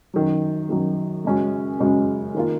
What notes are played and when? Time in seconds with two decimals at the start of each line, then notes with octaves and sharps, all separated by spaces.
0.14 F#2 D#3 F#3
0.69 F#2 D#3 F#3
1.25 F#2 C#3 G#3 C#4 F#4
1.79 F#2 C#3 G#3 C#4 F#4
2.34 D#3 A#3 F4